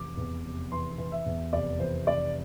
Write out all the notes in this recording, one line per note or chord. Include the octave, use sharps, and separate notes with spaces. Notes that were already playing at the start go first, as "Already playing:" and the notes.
Already playing: F1 E3 D6
E2
F1
E3 C6
E3
E5
E2
F1 D5
E3 C5
F1 D5